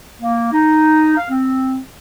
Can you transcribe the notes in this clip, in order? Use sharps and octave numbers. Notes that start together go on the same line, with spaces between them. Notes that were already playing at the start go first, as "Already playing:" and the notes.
A#3
D#4
F5
C4